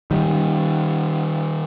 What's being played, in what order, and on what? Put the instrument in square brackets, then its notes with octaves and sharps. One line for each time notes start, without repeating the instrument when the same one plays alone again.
[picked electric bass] D#3 G3